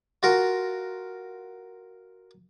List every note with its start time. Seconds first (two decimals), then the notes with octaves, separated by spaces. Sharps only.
0.23 F4 F#4 A#4